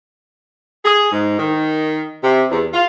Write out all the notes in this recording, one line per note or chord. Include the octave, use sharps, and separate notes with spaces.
G#4
G#2
D#3
C3
E2
F4